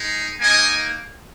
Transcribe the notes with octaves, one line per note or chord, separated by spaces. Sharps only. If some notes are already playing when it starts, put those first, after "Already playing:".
Already playing: G#3 D#4
A#3 D#4 D#5 G#5